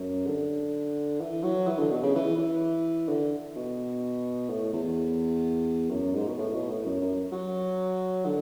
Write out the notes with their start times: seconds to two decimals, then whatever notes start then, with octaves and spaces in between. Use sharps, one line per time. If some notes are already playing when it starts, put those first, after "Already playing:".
Already playing: F#2
0.27 D3
1.21 E3
1.43 F#3
1.67 E3
1.79 D3
1.91 B2
2.03 C#3
2.15 E3
2.38 E3
3.09 D3
3.56 B2
4.49 A2
4.73 E2
5.90 F#2
6.14 G#2
6.27 B2
6.38 A2
6.54 B2
6.69 A2
6.85 F#2
7.01 F#2
7.32 F#3
8.26 D3